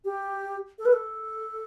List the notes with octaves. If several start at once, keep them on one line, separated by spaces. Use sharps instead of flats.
G4
A4
B4
A4